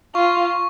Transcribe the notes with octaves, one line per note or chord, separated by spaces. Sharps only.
F4 C#6